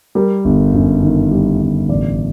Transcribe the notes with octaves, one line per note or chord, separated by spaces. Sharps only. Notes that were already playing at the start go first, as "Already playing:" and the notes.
G3 A#4
G1
F#2
D#3
G3
G1
A1 D5